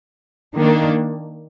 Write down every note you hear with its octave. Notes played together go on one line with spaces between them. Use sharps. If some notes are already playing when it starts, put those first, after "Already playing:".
D#3 A#3 D4